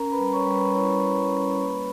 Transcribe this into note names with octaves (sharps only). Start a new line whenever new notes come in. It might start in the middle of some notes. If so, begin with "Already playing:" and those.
Already playing: C#4 A#4 A#5
B4 B5
G3
C#5 C#6
G3
B4 B5
E4 C#5 C#6
G3
C#4
A#3 B4 B5